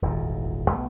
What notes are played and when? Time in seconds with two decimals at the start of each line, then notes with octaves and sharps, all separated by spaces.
0.02 D#1 G#1 E2 A#2
0.70 B1 A3 B3